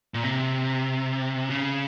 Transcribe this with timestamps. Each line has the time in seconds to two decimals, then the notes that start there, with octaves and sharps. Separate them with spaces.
0.14 A#2
0.24 C3
1.49 C#3